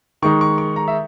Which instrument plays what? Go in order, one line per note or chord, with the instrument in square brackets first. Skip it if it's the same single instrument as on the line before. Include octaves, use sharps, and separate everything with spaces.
[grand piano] D#3 G#3 D#4 C#6
C#6
C#6
A#5
E5